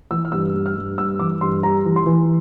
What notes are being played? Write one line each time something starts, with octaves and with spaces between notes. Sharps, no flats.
E3 E6
F6
G2 E6
G2
F6
G2
G2 E6
E3 D6
G2 C6
G3 A#5
E3
C6
E3